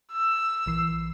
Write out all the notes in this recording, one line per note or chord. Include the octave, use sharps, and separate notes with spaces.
E6
A#1 E3 C7